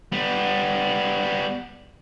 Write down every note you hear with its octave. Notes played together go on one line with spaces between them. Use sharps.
G3 B3